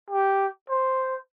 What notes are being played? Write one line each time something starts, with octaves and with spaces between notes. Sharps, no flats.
G4
C5